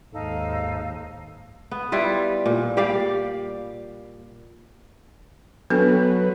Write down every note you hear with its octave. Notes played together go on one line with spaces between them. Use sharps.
D#2 G#2 D#4 A4 F5
B3
G3 E4 F4 B4
A#2
G3 G4 D5 F5
F#3 B3 D4 A4 B4